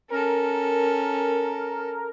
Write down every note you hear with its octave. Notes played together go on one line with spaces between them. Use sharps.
C#4 A4 A#4